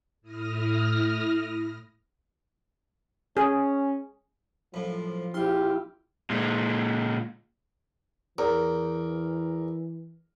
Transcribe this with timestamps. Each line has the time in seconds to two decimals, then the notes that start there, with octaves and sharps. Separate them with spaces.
0.21 A2 E4 D#6 F6 A#6
3.37 C#4 G#4
4.74 F#2 A2 F3
5.34 A#1 E4 F4 G4 C6
6.30 A#2 G#3
8.38 E2 E3 A#4